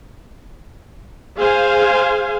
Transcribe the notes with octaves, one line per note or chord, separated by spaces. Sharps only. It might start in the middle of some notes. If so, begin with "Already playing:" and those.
G#4 C5 F5 G#5